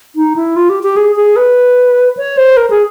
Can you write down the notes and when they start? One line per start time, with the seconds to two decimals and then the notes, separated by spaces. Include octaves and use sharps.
0.16 D#4
0.36 E4
0.56 F4
0.69 G4
0.83 G4
0.97 G#4
1.16 G#4
1.36 B4
2.17 C#5
2.37 C5
2.57 A#4
2.70 G#4